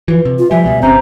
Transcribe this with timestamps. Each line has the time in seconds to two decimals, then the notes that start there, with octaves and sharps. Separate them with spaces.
0.08 E3 F3 B4
0.25 C3
0.39 F4
0.51 F3 G3 E5 G#5
0.64 C#2 B2 G3
0.82 G1 C3 C4 C#4 C5 A#5 G6